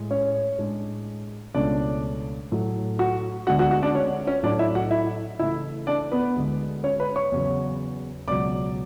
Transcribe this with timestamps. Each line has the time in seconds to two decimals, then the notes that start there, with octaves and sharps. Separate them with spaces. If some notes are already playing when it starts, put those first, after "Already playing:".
Already playing: A2 G#3
0.11 C#4 C#5
0.58 A2 G#3 D4
1.54 C#2 B2 A3 C#4 D4 D5
2.52 A2 F#3 A3
2.99 F#4 F#5
3.47 D2 D3 G#3 B3 D4 F#4 F#5
3.59 F#4 F#5
3.71 F#4 F#5
3.83 D4 D5
3.95 C#4 C#5
4.27 C#4 C#5
4.43 A2 F#3 A3 D4 D5
4.59 E4 E5
4.75 F#4 F#5
4.91 E4 E5
5.39 C#3 E3 A3 E4 E5
5.87 D4 D5
6.11 B3 B4
6.35 D2 D3 G#3
6.84 C#4 C#5
7.00 B4 B5
7.16 C#5 C#6
7.32 E2 C#3 F#3
8.28 C#2 B2 F#3 C#4 D5 D6